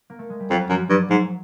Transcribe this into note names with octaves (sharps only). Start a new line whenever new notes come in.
A#3
A3
G#3
G3
F2 F#3
F#2 F3
G2 F#3
G#2 F#3